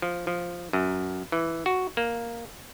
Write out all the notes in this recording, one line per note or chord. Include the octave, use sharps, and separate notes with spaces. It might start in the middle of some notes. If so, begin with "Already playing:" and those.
F3
F3
F#2
E3
F#4
A#3